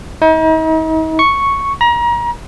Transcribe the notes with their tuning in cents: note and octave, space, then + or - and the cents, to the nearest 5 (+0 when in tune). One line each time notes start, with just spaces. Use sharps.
D#4 +40
C#6 +0
A#5 +35